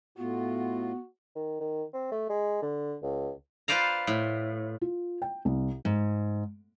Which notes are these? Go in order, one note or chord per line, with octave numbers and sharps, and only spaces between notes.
A2 B3 F4 F#4
D#3
D#3
C4
A3
G#3
D3
C#2
F4 B4 C5 D5 F5 A#5
A2
F4
G5
C2
G#2